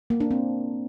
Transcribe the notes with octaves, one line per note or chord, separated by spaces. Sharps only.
A#3
D4
C4